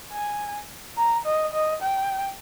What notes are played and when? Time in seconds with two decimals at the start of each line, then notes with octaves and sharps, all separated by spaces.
0.12 G#5
0.97 A#5
1.25 D#5
1.53 D#5
1.82 G5